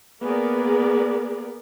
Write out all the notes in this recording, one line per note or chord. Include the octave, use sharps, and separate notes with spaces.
A#3 B3 G#4 A#4 D5